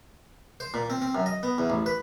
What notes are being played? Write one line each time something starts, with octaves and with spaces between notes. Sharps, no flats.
C5
A#2
C4
C4
F#2
D#5
B3
E2
A1
B4